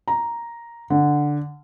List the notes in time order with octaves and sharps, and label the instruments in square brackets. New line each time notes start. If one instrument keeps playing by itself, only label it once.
[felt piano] A#5
D3